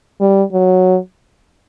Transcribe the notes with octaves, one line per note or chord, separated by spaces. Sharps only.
G3
F#3